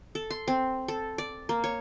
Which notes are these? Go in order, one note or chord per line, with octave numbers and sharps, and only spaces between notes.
A4
C6
C4
A4
D5
A#3
C#5